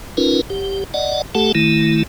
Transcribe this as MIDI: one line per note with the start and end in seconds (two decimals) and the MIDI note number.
0.17 0.41 61
0.17 0.41 63
0.17 0.41 65
0.17 0.41 70
0.17 0.41 71
0.50 0.84 30
0.50 0.84 67
0.94 1.22 74
0.94 1.22 75
0.94 1.22 78
1.35 1.52 57
1.35 1.52 67
1.35 1.52 69
1.35 1.52 78
1.35 1.52 81
1.55 2.03 51
1.55 2.03 57
1.55 2.03 64